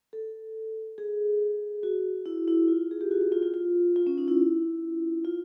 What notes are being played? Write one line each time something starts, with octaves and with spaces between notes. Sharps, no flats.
A4
G#4
F#4
E4
E4
F4
G#4
G4
F#4
F#4
F4
F4
F4
F4
C#4
D#4
E4
F4